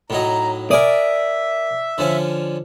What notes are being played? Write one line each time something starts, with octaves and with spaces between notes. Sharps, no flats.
A2 F#3 D#4 A#5
A#4 D5 E5 G#5 D#6
D3 F3 C#4